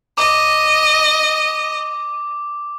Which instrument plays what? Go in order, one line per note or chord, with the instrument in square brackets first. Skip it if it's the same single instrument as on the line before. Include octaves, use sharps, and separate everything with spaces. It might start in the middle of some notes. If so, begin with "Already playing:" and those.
[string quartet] D#5 [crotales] D6